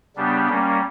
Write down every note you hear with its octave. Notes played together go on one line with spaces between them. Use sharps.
C#3 G3 B3 D4 G4
G3 A#3 C#4